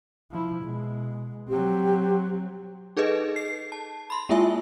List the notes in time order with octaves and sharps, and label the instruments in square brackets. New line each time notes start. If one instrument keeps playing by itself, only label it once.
[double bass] F3 E4
B2 G#3
[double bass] F#3 C4 [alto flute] G4
[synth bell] D#4 G#4 A4 B4 D#5
C7
A5
B5 C6
G#3 A#3 E4 F4 E5 G#5